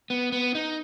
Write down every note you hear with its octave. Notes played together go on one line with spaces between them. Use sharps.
B3
B3
D#4